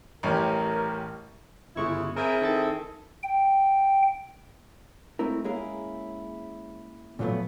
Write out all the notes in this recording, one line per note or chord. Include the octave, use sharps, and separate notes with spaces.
A1 G3 C#4 A#4
G1 C#3 G#3 E4 C#6
C4 E4 G#4 A#4 G#5
D#3 A4 A6
G5
G#3 A3 C4 E4 A#4
G#3 A#3 C#4 E4 G#4 A#4
A#2 F3 F#3 A3 B3